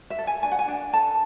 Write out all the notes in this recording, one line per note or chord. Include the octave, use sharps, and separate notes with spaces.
E5
A4
G#5
D4 G#5
F#5
G#5
D4
A4 A5